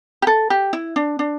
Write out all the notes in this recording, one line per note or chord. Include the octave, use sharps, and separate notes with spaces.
G4
A4
G4
E4
D4
D4